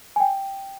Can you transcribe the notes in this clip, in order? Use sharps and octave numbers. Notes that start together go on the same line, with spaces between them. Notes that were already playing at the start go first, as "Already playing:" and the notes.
G#5
G5